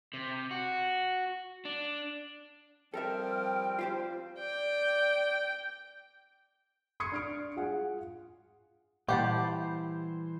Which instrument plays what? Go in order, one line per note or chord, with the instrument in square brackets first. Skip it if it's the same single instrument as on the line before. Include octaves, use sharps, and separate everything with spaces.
[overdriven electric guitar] C3
F#4
D4
[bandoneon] F3 G3 C4 [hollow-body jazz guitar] A4 A#4 E5 [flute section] G5 F6
[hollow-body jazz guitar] F4 G4 C5
[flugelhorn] D5 [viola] G5
[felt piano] C6 C#6 D#6 G#6 C7 C#7
D4 F6 D7
F4 G#4 F#5
[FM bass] A#2 [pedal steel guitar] E3 C5 [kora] G3 [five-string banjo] G4 F#5 A5